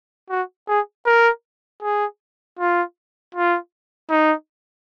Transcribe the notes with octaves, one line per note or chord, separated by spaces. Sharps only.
F#4
G#4
A#4
G#4
F4
F4
D#4